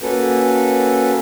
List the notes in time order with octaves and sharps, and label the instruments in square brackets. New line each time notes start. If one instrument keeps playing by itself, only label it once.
[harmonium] A#3 C#4 F#4 A4 B4